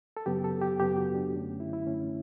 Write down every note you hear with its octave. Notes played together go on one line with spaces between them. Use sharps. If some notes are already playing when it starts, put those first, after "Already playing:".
A4
F#2 C#3 F#3 B3 G4
A4
G4
F#2 C#3 F#3 B3 G4
F#4
D4
F#2 D3 A3 C#4
E4
E4
F#2 D3 A3 C#4